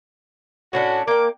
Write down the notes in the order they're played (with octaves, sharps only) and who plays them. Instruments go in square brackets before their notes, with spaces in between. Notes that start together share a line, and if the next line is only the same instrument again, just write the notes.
[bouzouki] A2 C#4 D4 [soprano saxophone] F#4
[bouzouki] A#3 G5 [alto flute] A#4 [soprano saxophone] D6